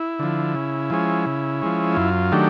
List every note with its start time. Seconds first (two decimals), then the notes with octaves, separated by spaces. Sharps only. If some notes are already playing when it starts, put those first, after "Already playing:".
Already playing: E4
0.19 D3 F3
0.55 C#3
0.90 F3 G#3 C#4
1.26 C#3
1.62 F3 G#3 C#4
1.96 F#2 F4
2.32 D#3 F#3 A3 D4 G4